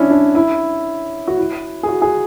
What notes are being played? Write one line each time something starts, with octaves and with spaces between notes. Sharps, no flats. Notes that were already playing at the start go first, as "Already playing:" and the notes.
Already playing: C#4 D4 E4
D4
E4
F#4
E4
G#4
F#4
G#4